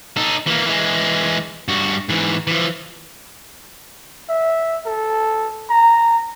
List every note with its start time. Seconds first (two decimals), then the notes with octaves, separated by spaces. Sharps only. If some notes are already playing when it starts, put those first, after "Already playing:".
0.17 D#4 A4
0.47 E3 A#3
0.66 E3 G#3
1.68 G2 F#4
2.09 G#2 E3
2.47 E3 F3
4.29 E5
4.86 A4
5.70 A#5